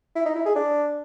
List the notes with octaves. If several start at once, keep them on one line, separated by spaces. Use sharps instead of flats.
E4
D#4
E4
G#4
D4